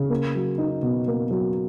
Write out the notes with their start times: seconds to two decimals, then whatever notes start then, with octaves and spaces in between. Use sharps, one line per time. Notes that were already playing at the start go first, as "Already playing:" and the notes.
Already playing: C#3
0.10 A#3
0.35 F#3
0.58 D#4
0.82 B2
1.07 A#3
1.31 F#3